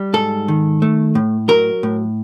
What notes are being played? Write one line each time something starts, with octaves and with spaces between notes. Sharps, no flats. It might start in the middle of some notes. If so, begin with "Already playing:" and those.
Already playing: G3
G#2 A4
D#3
A3
A2
F#3 A#4
A2